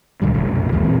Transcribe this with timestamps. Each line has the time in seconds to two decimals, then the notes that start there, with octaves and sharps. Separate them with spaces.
0.22 D2 A#2 D3 G3
0.34 F1 B1 F#2 A2
0.73 D2 E3 G#3 A#3
0.84 A#2 C4